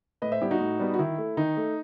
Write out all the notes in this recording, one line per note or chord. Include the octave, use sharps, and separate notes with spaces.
A2 B4 D#5
C5 E5
G3 B3 E4 G4
D#4 F#4
A2
G3 B3
F#4
D#3 E4
A3
D#3 D#4
A3